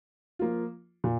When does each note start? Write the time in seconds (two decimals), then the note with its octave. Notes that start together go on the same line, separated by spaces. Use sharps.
0.39 F3 A#3 F4
1.04 A#2